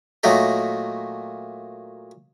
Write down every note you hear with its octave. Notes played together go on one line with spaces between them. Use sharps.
A#2 F#3 A3 A#3 D#4 A4